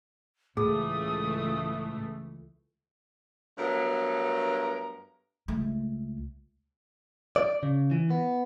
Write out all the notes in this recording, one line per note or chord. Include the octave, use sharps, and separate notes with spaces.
C#2 A2 E3 A3 G#4 D#6
G2 F#3 A3 B3 A#4
C#2 A3
D5
C#3
E3
B3